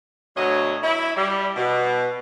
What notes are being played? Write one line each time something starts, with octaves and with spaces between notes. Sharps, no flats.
D2 B2 F#3 C#5 D#5
E4
G3
B2